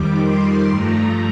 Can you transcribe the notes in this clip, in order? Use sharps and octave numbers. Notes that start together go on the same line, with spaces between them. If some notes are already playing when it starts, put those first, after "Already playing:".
Already playing: F2 D#3 G3 D6
C6
G2 F3 A3 A#5